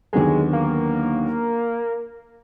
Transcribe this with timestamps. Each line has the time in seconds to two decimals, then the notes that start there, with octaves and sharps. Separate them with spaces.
0.13 D#2 D3 F#3 G#3 B3
0.53 A#3